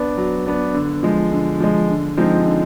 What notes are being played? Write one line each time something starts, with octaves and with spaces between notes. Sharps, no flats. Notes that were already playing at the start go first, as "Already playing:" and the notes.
Already playing: B3 D4
F#3
B3 D4
D3
F3 G#3
D3
F3 G#3
D3
F3 G#3 C4 D#4
D3